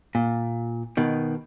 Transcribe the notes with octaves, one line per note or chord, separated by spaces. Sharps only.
A#2
B2 D#3